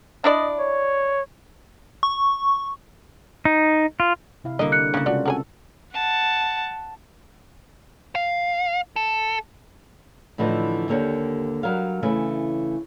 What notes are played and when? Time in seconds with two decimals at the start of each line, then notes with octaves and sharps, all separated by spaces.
0.24 D4 E4 D5 D#5
0.59 C#5
2.03 C#6
3.45 D#4
4.00 F4
4.44 C3 E4 F5
4.59 D3 G3 A#3 D#5
4.72 F#6 C#7
4.94 C#3 A#3 E4
5.06 C3 G#3 D4 F4 F#4
5.26 C4 F#4 A4 A#4 G#5
5.93 F#5 A5
8.15 F5
8.96 A4
10.38 A2 D3 E3 F3 D#4
10.89 D#2 D3 A#3 G4 C#5
11.63 F#3 G3 A#4 F5
12.03 C#3 E3 A3 C#4